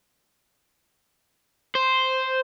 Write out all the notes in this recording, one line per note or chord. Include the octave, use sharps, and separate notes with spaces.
C5